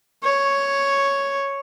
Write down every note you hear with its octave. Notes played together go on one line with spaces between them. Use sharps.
C#5